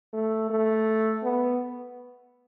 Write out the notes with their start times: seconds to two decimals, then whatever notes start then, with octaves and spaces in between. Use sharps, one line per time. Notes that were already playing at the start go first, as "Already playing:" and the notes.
0.13 A3
0.50 A3
1.23 B3